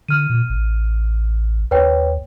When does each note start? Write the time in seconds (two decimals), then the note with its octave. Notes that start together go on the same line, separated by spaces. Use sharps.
0.08 D3 F6 D#7
0.29 A#2
0.50 A1
1.71 D#2 B4 C#5 G5